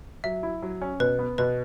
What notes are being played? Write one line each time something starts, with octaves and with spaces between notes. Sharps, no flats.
F#3 E5
E4
F#3
C#4
B2 B4
B3
B2 B4